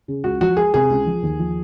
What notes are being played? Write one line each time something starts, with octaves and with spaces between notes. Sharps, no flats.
C#3
C#2 F#4
F3 F#4
G#3 G#4
C3 G#4
C#2
F3
D#2
F3